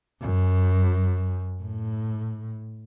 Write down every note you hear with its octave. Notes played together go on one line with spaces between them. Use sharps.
F#2
A2